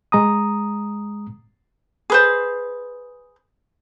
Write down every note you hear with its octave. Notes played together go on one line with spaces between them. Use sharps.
G#3 A#5 D#6
G#4 B4 C5